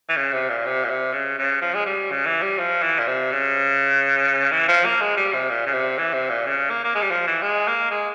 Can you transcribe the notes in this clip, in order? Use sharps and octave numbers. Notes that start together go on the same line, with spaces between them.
E3
C#3
C3
A#2
C3
A#2
C3
C#3
C#3
F3
G#3
G3
C#3
E3
G3
F3
E3
A#2
C3
C#3
E3
F3
A#3
G#3
G3
C3
A#2
C#3
C3
E3
C3
A#2
C#3
A#3
A#3
G#3
G3
F3
E3
G#3
A#3
G#3